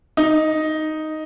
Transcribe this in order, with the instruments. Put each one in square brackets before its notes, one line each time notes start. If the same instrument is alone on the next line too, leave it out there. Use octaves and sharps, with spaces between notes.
[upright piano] D#4